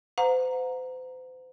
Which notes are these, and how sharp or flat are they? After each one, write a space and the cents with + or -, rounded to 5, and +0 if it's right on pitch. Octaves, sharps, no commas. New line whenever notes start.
C5 -40 F#5 -40 A#5 +0